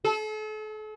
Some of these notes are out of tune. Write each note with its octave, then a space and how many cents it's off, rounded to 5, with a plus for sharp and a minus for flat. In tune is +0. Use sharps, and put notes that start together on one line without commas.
A4 -40